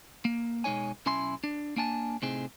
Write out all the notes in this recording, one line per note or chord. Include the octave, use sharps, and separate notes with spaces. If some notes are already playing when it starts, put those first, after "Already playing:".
A#3
B2 G#3 D#4 C#5 G#5
B1 C#4 E4 G#5 C6
D4
A#3 D4 G#5 A5
A2 C3 C4 D#4 G#4